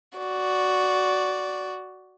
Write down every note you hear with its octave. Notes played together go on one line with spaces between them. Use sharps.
F#4 D5